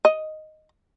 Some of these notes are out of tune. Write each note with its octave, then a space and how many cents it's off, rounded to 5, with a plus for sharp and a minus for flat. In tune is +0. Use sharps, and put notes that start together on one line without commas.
D#5 +0